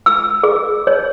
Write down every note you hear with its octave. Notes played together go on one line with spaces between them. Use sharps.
E6
G#4
C#5